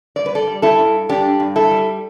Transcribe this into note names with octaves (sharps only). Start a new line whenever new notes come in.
G2 D5
B4
A4 D5
G3
E4 A4
G2
G2 D4 G4
G2
E4 A4
G3